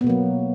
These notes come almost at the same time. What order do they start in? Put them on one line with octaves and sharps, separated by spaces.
B3 B2 A#3 F#3